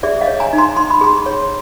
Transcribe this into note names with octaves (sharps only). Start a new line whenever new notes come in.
G#4 D5 E5
D#5 F5
C#5
G#5 A#5
D#4
A#5 C6
D#4 C6
B5
G#4 A#5 C6
C#5